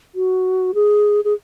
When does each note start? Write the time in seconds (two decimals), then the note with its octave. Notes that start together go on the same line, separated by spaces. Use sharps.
0.15 F#4
0.75 G#4
1.24 G#4